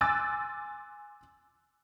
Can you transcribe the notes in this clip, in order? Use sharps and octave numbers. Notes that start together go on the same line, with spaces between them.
G#5 C6 D6 E6 F#6 A6